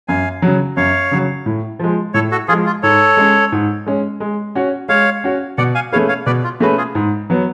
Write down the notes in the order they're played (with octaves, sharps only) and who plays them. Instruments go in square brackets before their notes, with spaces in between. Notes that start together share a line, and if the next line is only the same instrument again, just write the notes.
[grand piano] F#2 [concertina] F5 G#5
[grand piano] C#3 F#3
[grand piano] F#2 [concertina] C#5 F5
[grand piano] C#3 F#3
A2
F3 G#3
[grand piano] A2 [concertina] A4 C#5
[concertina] F#4 A4
[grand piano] F3 [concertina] F4 G#4
[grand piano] G#3
[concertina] F4
[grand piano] G#2 [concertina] A4 C#5
[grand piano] G#3 C#4
G#2
G#3 C#4
G#3
C#4 F#4 C#5
[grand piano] G#3 [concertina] C#5 F5
[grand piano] C#4 F#4 C#5
[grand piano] B2 [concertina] D5 F#5
[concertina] F5 G#5
[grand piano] A3 C#4 G#4 B4 [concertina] C#5 F5
[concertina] C#5 F5
[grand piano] B2 [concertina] B4 D5
[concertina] F4
[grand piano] A3 C#4 G#4 B4 [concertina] F#4
[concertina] F4 G#4
[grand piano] G#2
F#3 B3